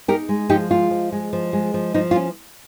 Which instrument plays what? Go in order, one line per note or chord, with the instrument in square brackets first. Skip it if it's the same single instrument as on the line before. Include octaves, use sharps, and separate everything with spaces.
[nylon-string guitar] D#4 G4 A#4
G#3
F3 D#4 G4
G#3 F4
F3
G#3
F3
G#3
F3
F3 D#4
F4
C#4